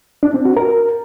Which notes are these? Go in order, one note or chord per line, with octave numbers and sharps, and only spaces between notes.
D4
C4
F#4
A#4